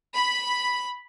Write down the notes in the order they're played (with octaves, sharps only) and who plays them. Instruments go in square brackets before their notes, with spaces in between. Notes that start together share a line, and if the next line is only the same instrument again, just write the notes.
[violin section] B5